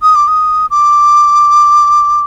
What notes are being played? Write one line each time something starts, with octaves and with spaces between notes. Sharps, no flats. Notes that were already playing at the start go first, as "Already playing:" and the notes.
D#6
D6
D#6
D6